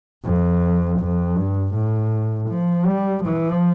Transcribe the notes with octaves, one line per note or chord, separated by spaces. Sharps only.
F2
F2
G2
A2
F3
G3
F3